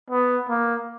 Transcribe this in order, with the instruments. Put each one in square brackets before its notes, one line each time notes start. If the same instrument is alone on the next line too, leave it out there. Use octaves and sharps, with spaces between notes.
[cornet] B3
A#3